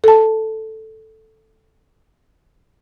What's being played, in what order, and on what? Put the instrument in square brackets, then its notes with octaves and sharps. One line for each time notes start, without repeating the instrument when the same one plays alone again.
[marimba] A4 A5